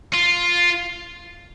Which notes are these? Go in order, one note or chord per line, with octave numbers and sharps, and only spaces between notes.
F4